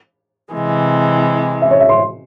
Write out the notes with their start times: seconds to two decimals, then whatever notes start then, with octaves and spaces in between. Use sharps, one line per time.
0.53 C3 E3 G#3
1.62 E5
1.71 C#5
1.80 E5
1.89 C6